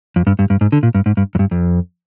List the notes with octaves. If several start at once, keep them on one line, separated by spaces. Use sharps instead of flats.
F2
G2
G2
G2
G#2
D3
A#2
G2
G#2
G2
F2
G2
F2